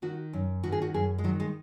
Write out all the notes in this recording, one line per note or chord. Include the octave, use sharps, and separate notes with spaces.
D#3 F#4
F#2
D#3 F#4
G#4
F#4
F#2 G#4
G#3
D#3 F#3
G#3